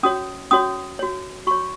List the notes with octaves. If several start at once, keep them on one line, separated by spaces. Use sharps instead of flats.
C#4 F#4 C#5 D#6
C#4 F#4 C#5 D#6
F#4 C#5
F#4 C#5 C#6